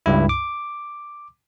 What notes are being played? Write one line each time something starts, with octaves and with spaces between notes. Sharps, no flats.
C#2 G2 E4
D6